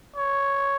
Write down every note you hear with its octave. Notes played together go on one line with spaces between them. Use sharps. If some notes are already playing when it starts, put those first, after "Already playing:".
C#5